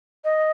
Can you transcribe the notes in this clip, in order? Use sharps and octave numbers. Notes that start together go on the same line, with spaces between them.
D#5